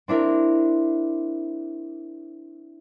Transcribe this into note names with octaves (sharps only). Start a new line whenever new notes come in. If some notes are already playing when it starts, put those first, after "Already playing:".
C4 D4 E4 A#4